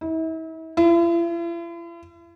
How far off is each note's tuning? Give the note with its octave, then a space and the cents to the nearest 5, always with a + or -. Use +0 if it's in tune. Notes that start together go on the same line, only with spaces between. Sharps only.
E4 -40
E4 +45